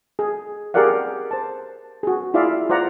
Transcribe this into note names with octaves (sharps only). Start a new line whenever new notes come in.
G#4
G4 G#4 A#4 D5 F5 F#5
C5 A5
F#4 G#4
E4 F4 G#4 D5 E5 F5
F4 C5 D5 F#5 A#5